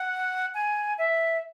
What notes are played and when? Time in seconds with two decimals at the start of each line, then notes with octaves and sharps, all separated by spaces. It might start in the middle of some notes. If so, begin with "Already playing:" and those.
Already playing: F#5
0.54 G#5
0.98 E5